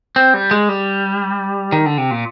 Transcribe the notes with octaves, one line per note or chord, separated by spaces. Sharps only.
C4
G3
G#3
G3
D#3
D3
C3
A#2